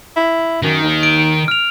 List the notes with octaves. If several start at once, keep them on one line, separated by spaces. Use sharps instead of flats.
E4
F#2 D#3
D#2
D7
F6 F7